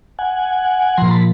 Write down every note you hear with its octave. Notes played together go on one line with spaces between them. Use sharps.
F#5 G#5
A#2 F3 A#5 C6
A5 B5